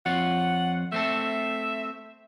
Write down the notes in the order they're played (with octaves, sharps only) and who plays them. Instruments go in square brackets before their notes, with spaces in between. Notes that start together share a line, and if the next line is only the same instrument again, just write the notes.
[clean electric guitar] F2 F4 C#5 [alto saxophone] F#5
[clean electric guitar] A3 C4 A4 [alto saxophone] E5